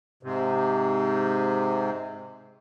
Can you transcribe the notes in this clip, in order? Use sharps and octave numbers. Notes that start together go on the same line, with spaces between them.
G#2 C3